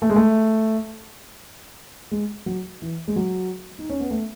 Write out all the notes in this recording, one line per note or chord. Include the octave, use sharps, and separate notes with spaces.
A3
G#3
A3
G#3
F#3
E3
G#3
F#3
D#4
C#4
B3
A3